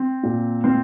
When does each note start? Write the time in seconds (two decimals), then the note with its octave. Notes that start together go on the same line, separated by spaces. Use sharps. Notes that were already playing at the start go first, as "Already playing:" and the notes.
Already playing: C4
0.23 A#2
0.64 C4